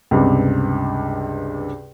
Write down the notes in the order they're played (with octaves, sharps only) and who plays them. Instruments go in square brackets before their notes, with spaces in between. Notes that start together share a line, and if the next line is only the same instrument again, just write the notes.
[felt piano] C#2 G2 C3